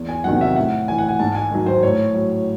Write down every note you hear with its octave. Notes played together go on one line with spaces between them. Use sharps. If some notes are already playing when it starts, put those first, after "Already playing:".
Already playing: E2
G#5
C3 D#3 F#3 F#5
E5
A2 F#5
E3 G#5
F#5
G#5
G#2 A5
G#5
D#3 F#3
C5
A2 C#5
F#3